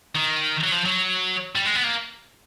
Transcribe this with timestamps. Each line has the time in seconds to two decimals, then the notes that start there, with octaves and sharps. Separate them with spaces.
0.15 D#3
0.63 F#3
0.71 F3
0.85 F#3
1.55 G3
1.65 G#3
1.75 B3
1.84 A#3